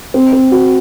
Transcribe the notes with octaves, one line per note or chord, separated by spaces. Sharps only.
C4
C4
F#4